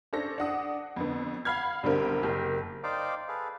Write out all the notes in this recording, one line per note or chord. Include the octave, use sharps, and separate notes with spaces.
C#4 D4 A4 C5 A#6
D4 F#5 D#6
F2 D3 B3
F5 F#5 B5 F6 G#6
B1 D3 G3 C4 A#4 C5
F#1 G4 A#4
D#4 C5 D5 F5 G5 D6
G#4 A4 B4 F5